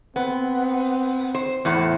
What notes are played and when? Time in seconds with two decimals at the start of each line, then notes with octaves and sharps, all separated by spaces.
0.16 B3 C4
1.35 C5
1.65 E2 A2 C5